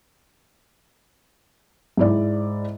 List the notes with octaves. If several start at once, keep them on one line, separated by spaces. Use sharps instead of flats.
G#2 E4 D5